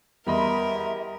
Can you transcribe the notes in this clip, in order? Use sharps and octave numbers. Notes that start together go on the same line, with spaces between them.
E2 G3 A#4 D#5 E5 B5 C6